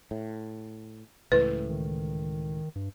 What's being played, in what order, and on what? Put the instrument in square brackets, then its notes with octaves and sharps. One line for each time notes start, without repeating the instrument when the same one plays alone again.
[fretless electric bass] A2
[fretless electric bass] C#2 A2 E3 [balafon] B4
[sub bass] D#3
G2